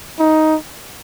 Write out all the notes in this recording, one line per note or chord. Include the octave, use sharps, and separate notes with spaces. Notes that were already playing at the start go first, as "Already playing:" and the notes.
D#4